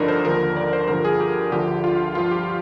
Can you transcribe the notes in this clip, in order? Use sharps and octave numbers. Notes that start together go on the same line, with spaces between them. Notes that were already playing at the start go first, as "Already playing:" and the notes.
Already playing: G2 D3 F3 D4 D#4 A#4
C5
D#2 D3 F3 A#4
D5
C5
G2 D3 F3 A#4
G#4
G4
D2 D3 F3 G4
F4
G2 F3 F4
G4